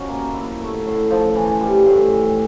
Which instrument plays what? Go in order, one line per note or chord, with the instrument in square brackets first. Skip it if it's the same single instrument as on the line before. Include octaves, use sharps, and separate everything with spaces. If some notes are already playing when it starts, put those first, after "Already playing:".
Already playing: [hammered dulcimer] F3 C#4 D#4 F#4
A#3
E4
A3
A2
F3
E3
G3
A2
E3